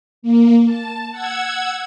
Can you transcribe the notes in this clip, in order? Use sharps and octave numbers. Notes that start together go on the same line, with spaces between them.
A#3
A5
F#5 E6 G#6